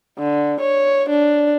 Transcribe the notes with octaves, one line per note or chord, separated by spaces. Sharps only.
D3
C#5
D4